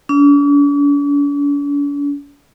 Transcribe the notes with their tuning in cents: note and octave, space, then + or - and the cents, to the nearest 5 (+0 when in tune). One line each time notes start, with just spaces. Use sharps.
D4 -45